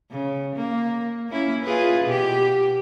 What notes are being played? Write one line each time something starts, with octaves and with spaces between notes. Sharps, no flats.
C#3
A#3
A#3 C#4 E4
F4 G#4 B4
B2 G4